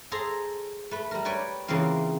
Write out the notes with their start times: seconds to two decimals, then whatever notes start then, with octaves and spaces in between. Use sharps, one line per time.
0.11 G#4 A4 C5 A#5
0.91 A3 B4
1.11 G3 A#4
1.25 B4 C#5 D5 G5 G#5
1.68 C#3 E3 A#3 C4 F4